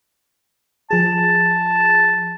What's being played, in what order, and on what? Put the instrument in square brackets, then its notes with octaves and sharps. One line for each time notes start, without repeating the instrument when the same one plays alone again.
[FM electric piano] F3 G#4 [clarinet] A5